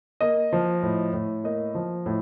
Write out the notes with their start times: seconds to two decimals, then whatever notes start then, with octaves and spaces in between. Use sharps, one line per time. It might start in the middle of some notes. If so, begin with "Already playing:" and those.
0.21 A#3 D#5
0.53 F3
0.83 A2
1.13 A2
1.44 A#3 D#5
1.75 F3
2.06 A2